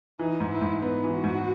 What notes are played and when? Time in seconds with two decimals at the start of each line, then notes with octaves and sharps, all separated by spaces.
0.19 E3 D#4
0.40 G#2
0.51 E4
0.61 G#2
0.82 B3 D#4
1.04 E3
1.13 F#4
1.24 G#2